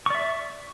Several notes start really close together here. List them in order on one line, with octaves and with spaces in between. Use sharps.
C#6 D5 E5